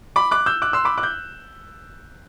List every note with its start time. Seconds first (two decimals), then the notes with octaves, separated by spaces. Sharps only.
0.16 B5 D6
0.31 D6 F#6
0.46 E6 G6
0.62 D6 F#6
0.73 C6 E6
0.85 B5 D6
0.98 D6 F#6
1.03 G6